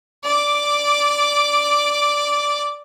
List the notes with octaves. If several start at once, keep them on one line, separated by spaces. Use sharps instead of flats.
D5 D6